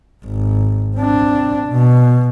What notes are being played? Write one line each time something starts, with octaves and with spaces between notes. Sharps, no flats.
G#1
C4 D4
B2